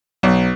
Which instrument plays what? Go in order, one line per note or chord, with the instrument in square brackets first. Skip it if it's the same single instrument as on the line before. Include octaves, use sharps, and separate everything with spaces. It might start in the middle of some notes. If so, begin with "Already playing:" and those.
[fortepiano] B1